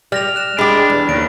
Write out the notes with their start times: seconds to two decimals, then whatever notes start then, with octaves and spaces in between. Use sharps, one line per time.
0.12 G3 F6 A#6 F7
0.36 F#6 E7
0.59 G#3 D4 G4 B5
0.90 E2
1.09 D#2 D7